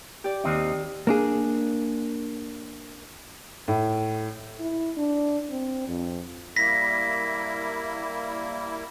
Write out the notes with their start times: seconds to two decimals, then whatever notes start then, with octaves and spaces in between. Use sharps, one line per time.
0.24 G4 D5
0.44 D#2 C4 D#4
1.07 A#3 D4 G#4
3.68 A2
4.60 E4
4.97 D4
5.50 C4
5.88 F2
6.56 G3 A#3 E4 A#6 B6